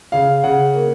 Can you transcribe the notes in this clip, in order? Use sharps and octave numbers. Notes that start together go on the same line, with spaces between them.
C#3 F5
C#3 F#5
A#3